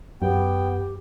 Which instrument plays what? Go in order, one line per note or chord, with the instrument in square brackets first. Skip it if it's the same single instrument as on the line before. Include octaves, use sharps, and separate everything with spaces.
[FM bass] F#2 [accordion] B3 G5 [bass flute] G4